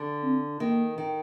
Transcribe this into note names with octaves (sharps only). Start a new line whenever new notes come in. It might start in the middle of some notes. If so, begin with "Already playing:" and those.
Already playing: D3
C4
D#3 A#3
D#3